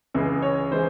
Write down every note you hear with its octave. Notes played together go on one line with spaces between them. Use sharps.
C#2 C#3 E3 G#3
C#5
C#3 E3 G#3 C5